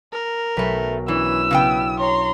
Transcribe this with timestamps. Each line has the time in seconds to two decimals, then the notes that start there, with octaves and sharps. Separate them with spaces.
0.12 A#4
0.57 B1 A3 B4
1.08 E3 C#4 D4 E4 B4 E6
1.51 C#3 B3 G5
1.99 C#5 A#5 C6